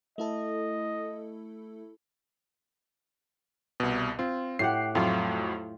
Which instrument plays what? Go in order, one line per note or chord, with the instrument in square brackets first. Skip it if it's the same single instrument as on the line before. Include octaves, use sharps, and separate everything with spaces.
[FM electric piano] A3 E4 A4 [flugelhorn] D#5
[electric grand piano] C2 B2
[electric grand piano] C4 [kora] F4
[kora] A2 G4 F#5 [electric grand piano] C7
[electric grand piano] F2 A2 F#3 [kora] F4